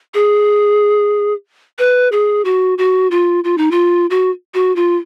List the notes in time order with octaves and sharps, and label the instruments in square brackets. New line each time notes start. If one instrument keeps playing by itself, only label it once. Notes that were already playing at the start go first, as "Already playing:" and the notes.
[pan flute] G#4
B4
G#4
F#4
F#4
F4
F4
D#4
F4
F#4
F#4
F4